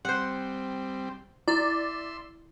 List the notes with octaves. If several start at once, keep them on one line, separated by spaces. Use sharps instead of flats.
G3 C4 C5 F#5
E4 D5 E5 C6